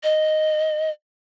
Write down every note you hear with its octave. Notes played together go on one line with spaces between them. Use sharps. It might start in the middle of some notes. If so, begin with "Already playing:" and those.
D#5